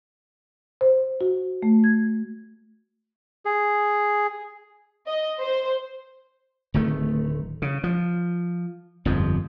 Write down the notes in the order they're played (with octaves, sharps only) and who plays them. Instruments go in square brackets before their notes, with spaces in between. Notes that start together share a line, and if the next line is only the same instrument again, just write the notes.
[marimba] C5
F#4
A3
G#6
[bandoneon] G#4
[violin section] D#5
C5
[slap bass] D1 D#3 A3
C#3
F3
G1 F2 G#2 F3